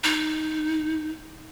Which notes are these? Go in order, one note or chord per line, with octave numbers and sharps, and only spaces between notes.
D#4